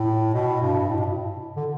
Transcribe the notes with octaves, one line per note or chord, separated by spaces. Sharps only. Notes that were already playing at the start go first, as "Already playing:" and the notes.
Already playing: A2
B2
G2
A2
B2
A2
D3